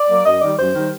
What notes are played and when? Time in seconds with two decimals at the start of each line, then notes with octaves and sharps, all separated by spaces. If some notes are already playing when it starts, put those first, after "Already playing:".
Already playing: D5
0.09 F#3 A#3
0.25 F#2 D#5
0.42 D#3 G3 D5
0.58 F#2 C5
0.74 D#3 G3